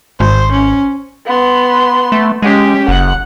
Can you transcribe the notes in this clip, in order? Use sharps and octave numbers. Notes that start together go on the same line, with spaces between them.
G#1 C5
C#4
B3 C6
A3
G#3 C#4 G4
F#1 F#5